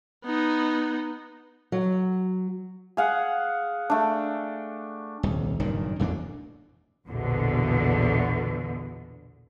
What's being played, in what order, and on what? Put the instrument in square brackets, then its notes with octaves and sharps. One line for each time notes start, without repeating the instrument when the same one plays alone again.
[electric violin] B3 D#4
[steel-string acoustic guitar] F#3
[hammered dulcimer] G#4 F5 F#5
A3 D4
[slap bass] D#1 C2
F#1 G2 A#2 D#3
A1 F2 B2 D4
[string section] A#1 E2 B2 D3